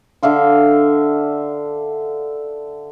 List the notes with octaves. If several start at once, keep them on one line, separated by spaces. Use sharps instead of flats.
D3 E5 F5 D6